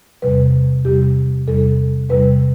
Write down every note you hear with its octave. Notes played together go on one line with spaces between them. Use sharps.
E2 C3 G3 B4
E2 C3 G3 G4
E2 C3 G3 A4
E2 C3 G3 B4